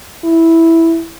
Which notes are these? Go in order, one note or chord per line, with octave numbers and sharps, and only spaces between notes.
E4